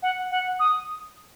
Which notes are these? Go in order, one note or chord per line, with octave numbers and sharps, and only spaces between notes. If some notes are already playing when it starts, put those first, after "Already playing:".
F#5
F#5
D#6